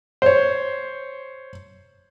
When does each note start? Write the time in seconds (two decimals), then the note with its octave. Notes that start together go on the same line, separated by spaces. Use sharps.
0.22 C5 C#5